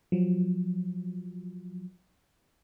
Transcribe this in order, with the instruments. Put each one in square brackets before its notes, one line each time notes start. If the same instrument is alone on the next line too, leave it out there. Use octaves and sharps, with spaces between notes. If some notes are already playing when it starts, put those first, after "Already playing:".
[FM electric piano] F3 F#3